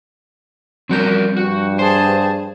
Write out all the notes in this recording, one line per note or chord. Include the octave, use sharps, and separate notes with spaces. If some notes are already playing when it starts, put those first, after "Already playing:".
F3 G3 C4 F#4 A#4 G6
G2 F#4
G#4 C5 A5